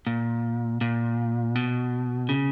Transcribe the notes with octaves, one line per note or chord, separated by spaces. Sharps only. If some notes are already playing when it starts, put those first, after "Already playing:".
A#2
A#2
B2
C#3